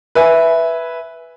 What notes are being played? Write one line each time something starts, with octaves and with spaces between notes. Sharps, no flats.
B4 E5 G#5